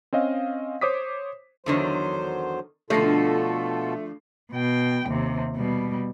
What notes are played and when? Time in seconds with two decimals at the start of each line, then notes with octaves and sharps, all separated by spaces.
0.13 C4 C#4 D#5 F5
0.81 C5 C#5 D6 D#6 B6
1.66 E2 D3 D#3 F#3 C5
2.90 B2 D3 F3 A3 F4 A4 A#6 C7
4.52 B2 G5
5.08 D#2 C3
5.56 B2 G3